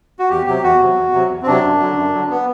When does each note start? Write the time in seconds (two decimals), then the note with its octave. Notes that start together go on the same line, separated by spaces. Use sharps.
0.19 F#4
0.30 E2 G4
0.46 C3 F#3 G4
0.63 E2 F#4
0.80 C3 F#3
0.97 E2
1.13 C3 F#3
1.30 E2
1.42 C4
1.47 C3 F#3 D4
1.64 F#2
1.80 D3 F#3
1.97 F#2
2.13 D3 F#3
2.30 B3